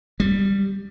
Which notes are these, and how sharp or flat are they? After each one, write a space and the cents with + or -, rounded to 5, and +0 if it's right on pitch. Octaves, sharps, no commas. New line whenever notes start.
G3 +10